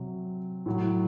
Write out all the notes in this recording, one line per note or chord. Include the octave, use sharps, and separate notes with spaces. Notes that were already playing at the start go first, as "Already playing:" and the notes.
Already playing: C3 F#3
A2 F#3